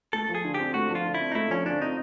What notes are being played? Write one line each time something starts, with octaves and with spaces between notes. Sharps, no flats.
A3 A4
F3
G#4
D3
C4 G4
A3 F#4
F3
F4
D3
E4
C4
D#4
A3 E4
F3 C#4
D3 D4
C4 D#4